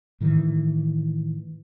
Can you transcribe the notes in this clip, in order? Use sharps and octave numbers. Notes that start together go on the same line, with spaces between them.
A2 D#3 E3